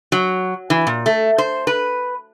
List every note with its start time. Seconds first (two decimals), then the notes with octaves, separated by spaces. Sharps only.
0.12 F#3
0.70 E3
0.87 A#2
1.06 A3
1.38 C5
1.67 B4